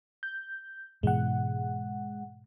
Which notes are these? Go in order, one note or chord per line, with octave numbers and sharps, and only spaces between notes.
G6
G#2 B2 E3 G#3 F#5